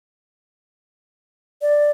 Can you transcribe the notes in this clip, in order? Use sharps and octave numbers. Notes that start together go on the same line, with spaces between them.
D5